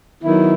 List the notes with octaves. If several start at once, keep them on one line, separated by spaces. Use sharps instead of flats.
D#3 F#3 B3 E4